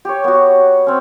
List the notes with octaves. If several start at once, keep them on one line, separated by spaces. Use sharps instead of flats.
G4 C#5
B3 F#4
C4 C#4